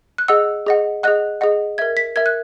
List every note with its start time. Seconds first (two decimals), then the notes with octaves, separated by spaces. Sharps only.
0.18 F#6
0.28 G#4 D#5 F#5 E6
0.67 G#4 D#5 F#5
1.03 G#4 D#5 F#5 F#6
1.41 G#4 D#5 F#5
1.78 A#4 E5 G#6
1.97 B6
2.16 A#4 E5 G#6
2.26 F#6